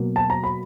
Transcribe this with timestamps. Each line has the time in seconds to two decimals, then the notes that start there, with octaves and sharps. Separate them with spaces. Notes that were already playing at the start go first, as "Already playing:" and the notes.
Already playing: B2 F#3 A#3
0.16 A5
0.30 A#5
0.44 B5